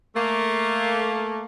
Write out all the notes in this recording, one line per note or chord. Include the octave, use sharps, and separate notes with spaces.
A3 A#3